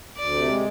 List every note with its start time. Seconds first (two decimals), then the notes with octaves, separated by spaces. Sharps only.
0.17 D2 D5
0.33 C3
0.48 G#3